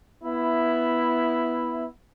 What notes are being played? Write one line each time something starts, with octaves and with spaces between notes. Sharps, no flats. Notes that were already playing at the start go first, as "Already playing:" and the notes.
B3 E4